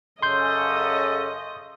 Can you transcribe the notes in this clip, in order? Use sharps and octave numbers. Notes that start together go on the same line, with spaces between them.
F#2 C#3 C#4 A4 D#5 C6 G6